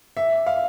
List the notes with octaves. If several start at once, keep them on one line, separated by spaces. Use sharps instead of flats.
E5
F5